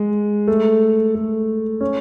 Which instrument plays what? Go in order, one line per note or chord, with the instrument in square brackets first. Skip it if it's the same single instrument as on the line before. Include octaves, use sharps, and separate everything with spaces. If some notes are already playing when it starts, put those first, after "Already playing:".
Already playing: [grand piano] G#3
A3
A3
C#4